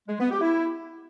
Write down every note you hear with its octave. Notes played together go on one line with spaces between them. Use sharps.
G#3
B3
G4
E4